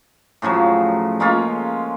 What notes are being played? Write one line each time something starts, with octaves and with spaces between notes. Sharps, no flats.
A2 C#3 F3 F#3
G#3 A#3 C#4 F4